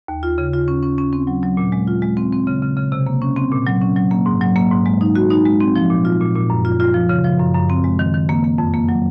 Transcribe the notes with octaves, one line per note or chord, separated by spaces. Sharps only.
D#2
F4
C#3
F4
C#4
C#4
C#4
C4
F#3
F#3
A#2
G#3
F4
G#3
C4
C4
C#3
C#3
C#3
C3
A#3
C#4
C4
A#2
F#3
C#4
F#3
A#3
G#2
F#3
A#3
G#2
G#3
D#4
F#4
D#4
G#3
C4
F3
A#2
F4
A#2
A#2
F#2
F4
F4
F3
C#3
F3
F#2
F#2
C4
G#3
D#3
D#3
A#3
A#3
F2
A#3
F#3